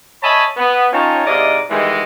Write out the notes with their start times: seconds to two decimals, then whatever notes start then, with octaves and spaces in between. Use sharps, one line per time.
0.22 C#5 D#5 E5 G#5 A5 B5
0.57 B3
0.91 C#4 D#4 F4 C#5 G5 A5
1.25 G#2 C3 E4 D5 D#5 F5
1.69 B2 D#3 E3 G3 G#3